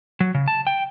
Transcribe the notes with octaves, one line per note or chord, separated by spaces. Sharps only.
F#3
C#3
A5
G5